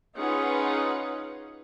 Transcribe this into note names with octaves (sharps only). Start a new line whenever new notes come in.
C#4 D#4 F4 G#4 B4 F#5